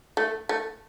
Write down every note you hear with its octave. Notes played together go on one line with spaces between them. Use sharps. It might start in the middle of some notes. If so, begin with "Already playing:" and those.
A3
A3